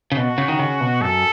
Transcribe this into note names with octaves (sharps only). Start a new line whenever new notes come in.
C#3
B2 F#4
C#3
D#3
C#3
B2
F#2 A4